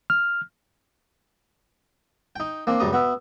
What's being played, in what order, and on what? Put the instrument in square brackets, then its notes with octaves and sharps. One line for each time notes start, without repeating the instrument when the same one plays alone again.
[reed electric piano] F6
[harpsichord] D#4 G5
A#3 C4 D4
C#2 F#2 G3 A#5 D#6
B3 F#4 E5